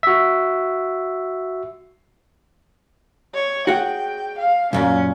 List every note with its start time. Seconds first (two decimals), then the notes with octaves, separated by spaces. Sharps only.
0.03 F#4 E5
3.34 C#5
3.67 F#4 G#4 F#5 G5
4.38 F5
4.73 C2 F#2 A#2 C#4